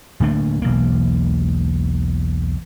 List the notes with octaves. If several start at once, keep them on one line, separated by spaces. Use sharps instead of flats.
D1 D3 A3 A#3
E1 B1 A#3